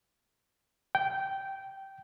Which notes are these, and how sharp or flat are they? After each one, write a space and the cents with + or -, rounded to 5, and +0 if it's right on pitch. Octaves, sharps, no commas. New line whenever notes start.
G5 -10